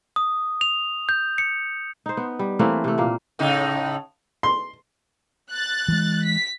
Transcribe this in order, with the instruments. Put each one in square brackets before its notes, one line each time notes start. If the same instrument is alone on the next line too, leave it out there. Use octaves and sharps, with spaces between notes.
[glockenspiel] D#6
F7
G6
C#7
[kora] D#4 C5
B3
G3
E3 A3 A#3 C4
C3 A3
A#2 A#3
[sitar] A2 C#3 D#4
[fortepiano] C6
[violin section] F#6 A6
[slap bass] E3 G#3
[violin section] B6